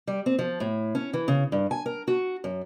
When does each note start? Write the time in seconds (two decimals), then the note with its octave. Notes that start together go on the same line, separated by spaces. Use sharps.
0.07 G3
0.26 C4
0.39 F3
0.60 A2
0.95 C#4
1.13 E3
1.28 C#3
1.52 G2
1.71 G#5
1.86 A#4
2.08 F#4
2.44 F#2